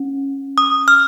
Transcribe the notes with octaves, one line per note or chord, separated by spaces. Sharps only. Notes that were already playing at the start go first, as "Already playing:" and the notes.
Already playing: C#4
D#6
F6